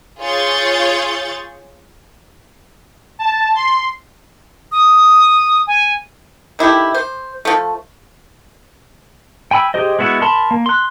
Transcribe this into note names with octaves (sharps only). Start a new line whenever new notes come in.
F4 G#4 C#5 G6 A6
A5
C6
D#6
G#5
D#3 E4 G4 A4
C5
F3 A3
G5 G#5 B5 E6
G4 G#4 C5 D#5
G#3 B3 E4 F#4
A#4 A5 B5 C6
A#3
C6 F#6